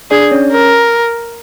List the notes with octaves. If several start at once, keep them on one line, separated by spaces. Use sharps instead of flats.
D4 G#4 D5
C#4 C#5
A#4